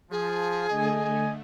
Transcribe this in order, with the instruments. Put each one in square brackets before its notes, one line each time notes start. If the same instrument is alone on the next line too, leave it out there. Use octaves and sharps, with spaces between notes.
[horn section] F3 [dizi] G#4
[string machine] D3 A3 [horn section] D#5 G#5